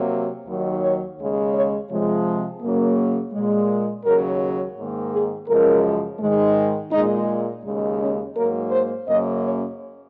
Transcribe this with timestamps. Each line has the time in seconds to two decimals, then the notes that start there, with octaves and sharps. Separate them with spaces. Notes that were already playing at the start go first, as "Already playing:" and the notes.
Already playing: C3 F#3 A#3
0.46 D#2 D#3 F#3
0.82 C#5
1.17 D#2 C#3 G#3
1.54 C#5
1.89 C3 F3 G#3
2.61 F#2 C#3 F#3 A#3
3.33 A#2 G#3
4.05 D#2 C#3 F#3 A#4
4.76 G#2 D#3 A#3
5.12 G#4
5.48 F#2 C#3 F3 G#3 A#4
6.20 G#2 D#3 G#3
6.92 A#2 G#3 D#4
7.64 D#2 C#3 G#3
8.00 C#4
8.36 G#2 F#3 A#3 A#4
8.71 C5
9.07 F#2 C#3 F#3 A#3 D#5
9.44 C#5